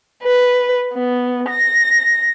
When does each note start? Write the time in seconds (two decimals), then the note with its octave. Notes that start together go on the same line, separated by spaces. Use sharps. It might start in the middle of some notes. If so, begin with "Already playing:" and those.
0.24 B4
0.95 B3
1.49 A#6